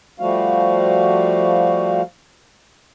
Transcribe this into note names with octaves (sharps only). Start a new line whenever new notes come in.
F3 G3 A3 F#4 F5